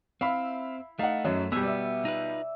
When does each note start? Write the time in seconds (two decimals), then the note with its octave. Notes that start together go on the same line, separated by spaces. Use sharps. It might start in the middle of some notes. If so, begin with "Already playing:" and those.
0.21 C4 E4 E5 F5 B5
0.99 A3 D#4 F5 F#5
1.25 F#2 F#3
1.52 B2 G3 B3 G#4 C#5 E6
1.63 B3 D5 E5
2.05 D#4 F4 B4